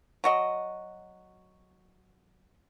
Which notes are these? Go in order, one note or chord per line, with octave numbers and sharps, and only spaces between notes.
F#3 F#4 D#5